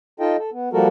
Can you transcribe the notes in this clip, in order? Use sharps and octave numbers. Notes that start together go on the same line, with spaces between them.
D#4 F4 A4 D#5 G5
A4
B3
F3 G3 A#3 F#4 A4 A#4